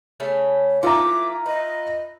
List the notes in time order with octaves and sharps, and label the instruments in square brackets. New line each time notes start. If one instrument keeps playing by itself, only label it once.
[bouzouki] C#3 A3 C#4
[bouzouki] E3 A3 [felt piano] F4 E5 A#5 [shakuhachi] D6
[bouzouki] B4 [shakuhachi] D#5